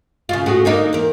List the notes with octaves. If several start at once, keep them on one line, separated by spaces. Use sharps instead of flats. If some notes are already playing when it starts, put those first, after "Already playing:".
C#3 F4
A2 F#4 G#4
D3 A#3 D#4
E2 A#4